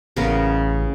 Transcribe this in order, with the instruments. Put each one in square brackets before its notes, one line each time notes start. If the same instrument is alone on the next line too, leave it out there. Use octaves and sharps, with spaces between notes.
[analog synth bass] A1 [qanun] C#3 B3 A#4